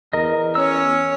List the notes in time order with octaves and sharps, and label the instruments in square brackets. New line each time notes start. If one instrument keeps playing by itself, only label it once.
[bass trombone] E2 [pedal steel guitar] A#4 D#5
[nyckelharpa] C#4 C#5 [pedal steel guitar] E6